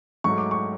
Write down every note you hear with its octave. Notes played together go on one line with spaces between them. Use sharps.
G#2 F#3 A3 C#6
D6
C#6